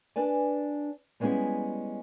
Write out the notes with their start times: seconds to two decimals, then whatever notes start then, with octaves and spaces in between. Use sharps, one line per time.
0.16 D4 B4 D5 G#5
1.20 G3 G#3 B3 C#4 E4 G#4